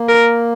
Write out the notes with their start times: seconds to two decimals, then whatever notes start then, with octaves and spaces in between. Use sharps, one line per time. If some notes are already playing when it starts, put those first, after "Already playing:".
Already playing: A#3
0.09 A#4